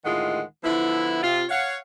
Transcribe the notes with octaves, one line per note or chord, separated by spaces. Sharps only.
D2 A2 D#3 G#3 F4 F#5
D3 F3 B3 E4
C3 F4
C#5 F5 F#5